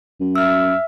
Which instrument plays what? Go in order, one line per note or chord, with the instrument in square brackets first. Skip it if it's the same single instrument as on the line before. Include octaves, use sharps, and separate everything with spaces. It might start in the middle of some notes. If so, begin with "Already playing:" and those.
[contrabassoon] F#2
[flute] E5 [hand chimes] E6 F6